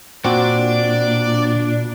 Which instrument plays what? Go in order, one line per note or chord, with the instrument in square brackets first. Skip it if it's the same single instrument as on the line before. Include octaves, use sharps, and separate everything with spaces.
[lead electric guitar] A#2 [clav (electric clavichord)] C4 F#4 [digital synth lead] D4 [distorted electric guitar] D5